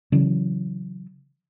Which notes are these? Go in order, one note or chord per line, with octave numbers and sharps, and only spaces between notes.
C#3 E3 F#3